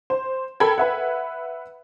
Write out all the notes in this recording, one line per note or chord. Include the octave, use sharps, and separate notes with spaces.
C5
A4 A#4 G5 B5 G#6
B4 E5 F#5